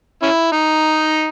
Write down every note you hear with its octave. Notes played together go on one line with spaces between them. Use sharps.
C#4 E4
D#4